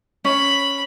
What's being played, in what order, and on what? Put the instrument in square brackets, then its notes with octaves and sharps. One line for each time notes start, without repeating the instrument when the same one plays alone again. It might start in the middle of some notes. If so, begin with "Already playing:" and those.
[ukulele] C#4 [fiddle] B5